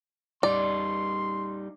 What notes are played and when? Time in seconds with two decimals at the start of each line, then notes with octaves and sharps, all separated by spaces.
0.43 G3 D#4 D5 C6